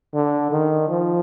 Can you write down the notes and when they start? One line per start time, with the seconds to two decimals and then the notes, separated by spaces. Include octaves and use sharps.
0.14 D3
0.52 D#3
0.89 F3